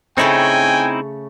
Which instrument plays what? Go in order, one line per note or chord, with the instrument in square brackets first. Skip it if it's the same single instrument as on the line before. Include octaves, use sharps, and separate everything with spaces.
[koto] C#3 A3 C#5 [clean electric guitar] C4 D#4 E4 [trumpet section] G5 G#5